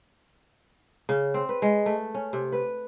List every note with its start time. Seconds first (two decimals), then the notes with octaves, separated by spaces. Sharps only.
1.09 C#3
1.34 C4
1.49 B4
1.62 G#3
1.86 A3
2.15 C#4
2.33 C3
2.52 B4